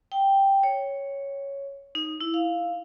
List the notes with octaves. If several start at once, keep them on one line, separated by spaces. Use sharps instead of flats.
G5
C#5
D#4
E4
F5